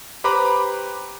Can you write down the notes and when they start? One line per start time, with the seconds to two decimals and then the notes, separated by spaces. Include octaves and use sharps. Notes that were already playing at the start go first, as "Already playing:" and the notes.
0.24 G4 B4 C5 A#5 B5 D6